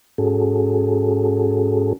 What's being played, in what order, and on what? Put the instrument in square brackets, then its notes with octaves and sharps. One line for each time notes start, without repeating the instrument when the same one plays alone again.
[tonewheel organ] G#2 C#4 F#4 G#4 A4